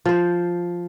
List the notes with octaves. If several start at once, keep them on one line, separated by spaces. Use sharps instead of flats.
F3 C5